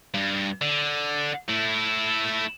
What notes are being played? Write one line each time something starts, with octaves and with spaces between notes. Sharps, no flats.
G2
D3
A3 E4